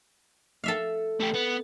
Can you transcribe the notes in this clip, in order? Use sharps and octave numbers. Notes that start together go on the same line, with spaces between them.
A4 E5 F5
A3 G4
B3